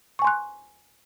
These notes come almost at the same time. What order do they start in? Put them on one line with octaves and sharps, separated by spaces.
C#6 G#5 C6 F#6